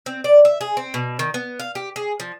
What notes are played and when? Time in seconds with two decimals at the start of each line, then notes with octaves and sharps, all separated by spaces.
0.06 C4
0.24 D5
0.45 E5
0.61 G#4
0.77 C4
0.94 B2
1.19 D#3
1.34 B3
1.59 F5
1.75 G4
1.96 G#4
2.20 F3